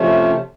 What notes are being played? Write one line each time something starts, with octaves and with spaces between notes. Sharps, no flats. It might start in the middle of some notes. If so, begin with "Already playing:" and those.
Already playing: C3 F3 A3 C#4